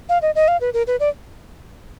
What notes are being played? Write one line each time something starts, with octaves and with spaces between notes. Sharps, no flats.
F5
D#5
D#5
F5
B4
A#4
B4
D5